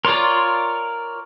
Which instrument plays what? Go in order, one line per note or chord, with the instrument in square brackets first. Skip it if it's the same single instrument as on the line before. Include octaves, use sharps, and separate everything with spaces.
[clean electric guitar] F4 C6 [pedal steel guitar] A#4 C#5 D5